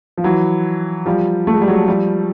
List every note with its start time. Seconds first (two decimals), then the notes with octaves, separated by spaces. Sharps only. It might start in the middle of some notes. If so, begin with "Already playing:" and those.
0.18 F3
0.24 E3 F#3
1.06 F3 G3
1.47 A3
1.54 G#3
1.62 G3
1.68 F#3 G#3
1.88 F3 G3